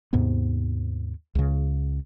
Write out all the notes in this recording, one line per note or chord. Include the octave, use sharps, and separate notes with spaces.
D#2 G#2 C3 B3
C#2 C#3